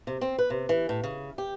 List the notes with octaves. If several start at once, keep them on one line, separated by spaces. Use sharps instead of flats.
C3
C4
B4
C3
E3
A2
C#3
G4